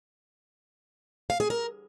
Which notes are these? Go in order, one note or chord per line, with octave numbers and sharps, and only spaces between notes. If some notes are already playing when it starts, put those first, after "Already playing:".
F5
G#4
A#4